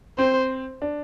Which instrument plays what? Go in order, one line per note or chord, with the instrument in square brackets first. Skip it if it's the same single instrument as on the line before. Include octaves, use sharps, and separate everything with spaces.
[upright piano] C4 [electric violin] C5
[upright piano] D4